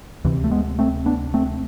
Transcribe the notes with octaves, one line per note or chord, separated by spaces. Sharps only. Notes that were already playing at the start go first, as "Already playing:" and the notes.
D2 C3 E3
A3
G#3 B3
A3 C4
B3 D4
A3 C4